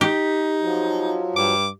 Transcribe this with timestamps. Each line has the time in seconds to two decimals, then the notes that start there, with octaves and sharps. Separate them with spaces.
0.01 D#4 G4
0.60 F3 F#3
1.36 G2 D6